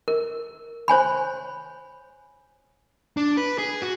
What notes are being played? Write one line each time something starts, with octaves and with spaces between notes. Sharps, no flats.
A#4
C5 C#5 G#5 B5
D4
B4
G#4
F#4